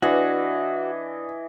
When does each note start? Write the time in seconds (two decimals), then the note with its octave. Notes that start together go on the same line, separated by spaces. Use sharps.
0.02 E3 D4 F#4 D#5